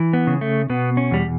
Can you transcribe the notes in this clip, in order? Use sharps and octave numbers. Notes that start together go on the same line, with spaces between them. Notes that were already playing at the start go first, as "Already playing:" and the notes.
Already playing: E3
B3
C#3
A3
B2 B3
C#4
E2 G3